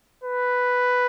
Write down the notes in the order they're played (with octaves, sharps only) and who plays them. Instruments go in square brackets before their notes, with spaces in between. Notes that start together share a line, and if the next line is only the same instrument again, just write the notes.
[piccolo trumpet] B4